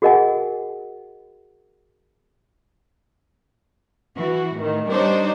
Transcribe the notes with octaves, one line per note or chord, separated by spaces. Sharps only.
F#4 G#4 A#4 D#5 F#5 G#5
E3 F#4
A2 D#3
G3 D4 D#4 G4 C5 C#5